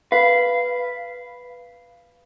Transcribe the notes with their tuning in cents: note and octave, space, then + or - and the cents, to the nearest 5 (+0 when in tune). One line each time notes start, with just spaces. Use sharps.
B4 +0 F5 -15